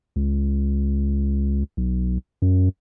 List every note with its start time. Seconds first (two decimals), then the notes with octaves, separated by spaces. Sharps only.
0.16 C#2
1.77 B1
2.42 F#2